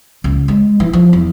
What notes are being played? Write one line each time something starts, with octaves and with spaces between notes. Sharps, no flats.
C#2
G#3
E3
F3
E2